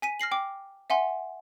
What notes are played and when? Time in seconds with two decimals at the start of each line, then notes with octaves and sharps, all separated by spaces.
0.02 G#5 B6 D#7
0.20 F6 A#6 C7 F#7
0.31 G5 D6
0.90 E5 F#5 G#5 C6